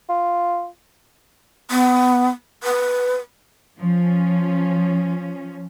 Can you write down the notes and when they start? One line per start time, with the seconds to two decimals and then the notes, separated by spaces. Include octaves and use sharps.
0.09 F4
1.71 B3
2.63 B4
3.79 F3 C#4